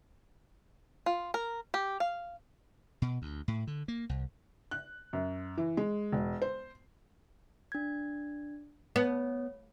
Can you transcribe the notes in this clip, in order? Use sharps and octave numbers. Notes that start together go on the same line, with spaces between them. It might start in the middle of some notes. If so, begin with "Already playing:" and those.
F4
A#4
G4
F5
B2
D2
A2
D3
A#3
C2
F#6
F#2
E3
G#3
E1
C5
D4 G#6
B3 C#5